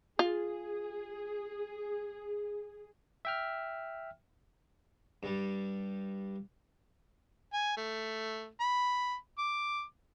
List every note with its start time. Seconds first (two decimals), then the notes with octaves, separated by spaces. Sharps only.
0.19 F4 G#4
3.25 E5 G5 F6
5.23 G2 G3
7.53 G#5
7.77 A3
8.60 B5
9.38 D6